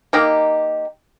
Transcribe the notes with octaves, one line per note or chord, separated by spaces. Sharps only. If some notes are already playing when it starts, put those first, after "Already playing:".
A#3 D#4 G4